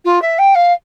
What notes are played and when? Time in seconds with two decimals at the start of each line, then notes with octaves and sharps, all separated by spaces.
0.04 F4
0.21 E5
0.38 G5
0.55 F5